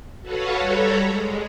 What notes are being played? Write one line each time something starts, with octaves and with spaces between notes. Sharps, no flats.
F#4 A4 B4 C#5 F5 F#5
G3 A4 C#5 A#5 B5
G#3